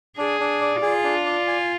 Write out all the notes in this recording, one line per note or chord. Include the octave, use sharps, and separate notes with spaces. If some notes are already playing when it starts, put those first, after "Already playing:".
D4 G#4
D4
D5
F4 G#4
D4
D5
G#5